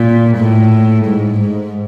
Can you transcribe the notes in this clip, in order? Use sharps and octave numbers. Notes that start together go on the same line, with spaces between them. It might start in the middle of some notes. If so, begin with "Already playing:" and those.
Already playing: A#2
A2
G#2
G#2